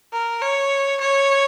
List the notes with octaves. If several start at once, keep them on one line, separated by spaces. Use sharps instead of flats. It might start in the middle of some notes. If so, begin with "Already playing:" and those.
A#4
C#5
C#5